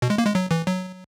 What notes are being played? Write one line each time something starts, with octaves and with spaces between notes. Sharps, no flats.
B2
G#3
A#3
G#3
F#3
E3
F#3